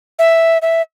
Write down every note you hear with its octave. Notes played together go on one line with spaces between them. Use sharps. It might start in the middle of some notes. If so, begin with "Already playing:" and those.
E5
E5